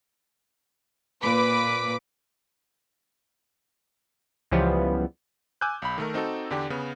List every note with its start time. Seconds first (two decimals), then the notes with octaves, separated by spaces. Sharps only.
1.22 A#2 B4 D6 B6
4.52 C#2 C#3 E3 F3 G3 B3
5.61 G#5 D6 E6 F#6 G6
5.82 B1 B5
5.98 D#3 A3 A#4
6.14 C4 D#4 F#4 A4
6.50 E2 D3 D4 G4
6.70 C#3 B3